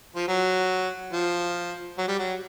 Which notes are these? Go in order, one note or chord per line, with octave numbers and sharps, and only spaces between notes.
F3
F#3
F3
F#3
G3
F#3